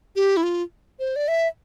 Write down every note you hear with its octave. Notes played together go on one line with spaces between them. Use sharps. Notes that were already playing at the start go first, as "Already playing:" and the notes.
G4
E4
F4
C5
D5
E5